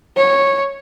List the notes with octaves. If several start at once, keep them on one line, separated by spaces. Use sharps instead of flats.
C#5